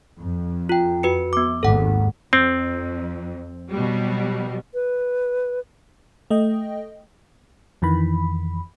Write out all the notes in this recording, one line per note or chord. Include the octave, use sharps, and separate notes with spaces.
F2
F4 G5
F#4 B4 C#7
B3 D6
G#1 D#2 A4 F#5
F2 C4
B2 F#3 G3
B4
A3 D#5 G5
F2 D#3 E3 B5